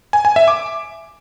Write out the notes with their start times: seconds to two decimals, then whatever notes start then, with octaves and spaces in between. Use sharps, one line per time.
0.13 G#5
0.25 G#5
0.36 E5
0.48 D6